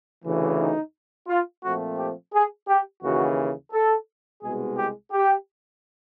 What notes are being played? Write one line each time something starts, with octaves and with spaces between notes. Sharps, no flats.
D2 C#3 E3
D#4
F4
A#2 F3 A3 C4 F#4
G4
G#4
G4
D#2 C#3 E3 F#4
A4
C2 B2 G#3 G#4
G4
G4